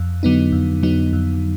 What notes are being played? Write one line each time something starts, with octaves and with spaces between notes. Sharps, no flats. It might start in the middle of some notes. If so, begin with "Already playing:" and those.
Already playing: F2
D3 F#3 B3 D#4
F2
D3 F#3 B3 D#4
F2